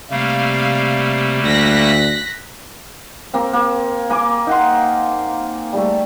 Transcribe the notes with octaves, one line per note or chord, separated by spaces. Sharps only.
C3 G3 A3 A#3 F5
D2 F#6 A#6 B6
A#3 C4
A#3
A#3 G#5 D6
D#4 F#5 C6
G3 A3